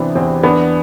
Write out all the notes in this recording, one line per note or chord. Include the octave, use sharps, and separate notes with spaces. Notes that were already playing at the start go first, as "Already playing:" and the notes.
Already playing: C3 E3 B3 C4 D4
E2 C4
E2 B3 D4